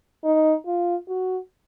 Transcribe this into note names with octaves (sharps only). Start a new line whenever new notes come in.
D#4
F4
F#4